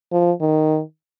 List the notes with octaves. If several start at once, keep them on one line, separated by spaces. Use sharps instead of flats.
F3
D#3